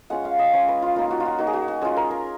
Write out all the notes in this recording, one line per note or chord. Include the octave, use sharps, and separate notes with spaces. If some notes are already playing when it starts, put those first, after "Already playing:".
G#3 C#4 F4 F#5
F5
D#5
G#3 C#4 F4 C#5
B4
F4
A#3 D#4 F4
F#4
F4
F#4
A#3 D#4 F#4
G#4
F#4
F#4
G#3 C#4 F4 G#4
A#4
A#4